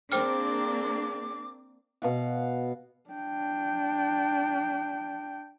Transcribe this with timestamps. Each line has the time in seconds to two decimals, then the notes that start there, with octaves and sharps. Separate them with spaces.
0.12 A#3 C4 D4 G#4 C5 G5 D6 F6
2.02 B2 F5 F#5
3.10 D4 G5